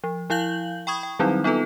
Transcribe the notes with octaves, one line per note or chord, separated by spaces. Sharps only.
F3
F3 E4 F5 G6 F#7
G5 B5 C#6 D#6 G#6
G5
D#3 F#3 G3 C4 D#4 E4
B3 D#4 F4 A4 B4